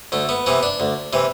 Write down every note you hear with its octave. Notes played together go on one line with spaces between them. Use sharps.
D2 A3
B3
C3 E3 B3
D4
D2
C3 E3